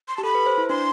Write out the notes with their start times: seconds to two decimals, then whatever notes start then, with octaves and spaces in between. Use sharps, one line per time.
0.08 C6
0.17 G4 A5
0.24 A4 B5
0.35 B4
0.46 C5
0.58 E4
0.69 D4 C6